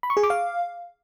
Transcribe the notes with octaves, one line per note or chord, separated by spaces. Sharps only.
B5
C#6
G#4
D6
F5